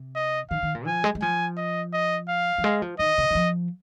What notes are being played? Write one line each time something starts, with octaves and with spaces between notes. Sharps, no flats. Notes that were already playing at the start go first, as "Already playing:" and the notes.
Already playing: C3
D#5
D#3 F5
D#3
A#2
F3 G#5
G#3
G#3
F3 G#5
D#5
D#5
F5
F3
G#3
F3
D#3 D#5
C3
D#3
F3